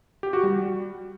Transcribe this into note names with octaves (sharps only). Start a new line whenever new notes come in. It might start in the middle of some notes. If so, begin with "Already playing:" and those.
G4
F#4
G3